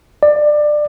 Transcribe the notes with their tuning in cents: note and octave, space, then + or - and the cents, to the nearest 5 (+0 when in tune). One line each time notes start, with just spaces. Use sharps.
D5 +20